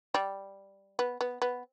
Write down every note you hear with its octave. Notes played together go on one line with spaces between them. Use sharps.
G3
B3
B3
B3